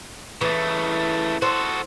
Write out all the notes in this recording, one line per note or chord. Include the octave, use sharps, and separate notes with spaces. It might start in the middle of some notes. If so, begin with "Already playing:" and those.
C#3 E3 A3
F#4 A4 C5